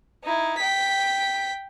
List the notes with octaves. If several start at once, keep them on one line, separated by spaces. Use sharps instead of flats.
D#4 E4
G5 B6